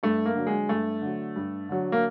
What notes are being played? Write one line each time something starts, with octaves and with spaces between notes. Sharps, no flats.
G2 A3
A#3
D3 F#3
G#3
G2 A3
D3 F#3
G2
D3 F#3
A#3